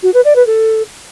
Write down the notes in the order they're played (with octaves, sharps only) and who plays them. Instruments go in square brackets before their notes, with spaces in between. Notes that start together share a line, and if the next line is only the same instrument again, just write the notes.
[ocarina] F#4
B4
D5
B4
A4